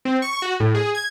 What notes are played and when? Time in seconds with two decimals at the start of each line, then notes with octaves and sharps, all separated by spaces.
0.05 C4
0.22 C#6
0.42 F#4
0.60 A2
0.75 G#4
0.95 G#6